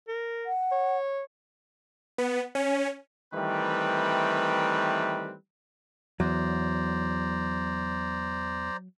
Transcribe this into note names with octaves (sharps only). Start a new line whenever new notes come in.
A#4
F#5
C#5
B3
C#4
D#3 E3 G3 A3 C4 B4
E2 F#3 C5 D5 A#5